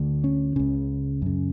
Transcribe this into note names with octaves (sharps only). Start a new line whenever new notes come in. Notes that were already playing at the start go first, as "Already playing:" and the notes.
Already playing: D2 D3
C#4
C#2 C#3
F#2 C#3